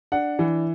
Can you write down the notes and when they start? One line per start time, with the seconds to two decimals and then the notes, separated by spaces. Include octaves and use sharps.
0.12 D4 F#5
0.39 E3